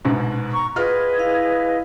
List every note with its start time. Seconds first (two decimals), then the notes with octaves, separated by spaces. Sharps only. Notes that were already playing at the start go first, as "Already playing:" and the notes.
0.05 A#1 G#2 B2
0.52 A#5 C#6
0.76 F4 F#4 G#4 B4 D#5 F6
1.18 E4 F5